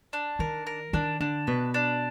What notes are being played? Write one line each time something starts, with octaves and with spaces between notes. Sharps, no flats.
D4
D#3 A#4
A#4
D#3 D4
D3 D4
B2 B4
D4